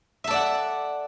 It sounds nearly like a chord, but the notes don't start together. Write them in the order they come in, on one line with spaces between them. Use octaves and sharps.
E5 A4 D5 F#5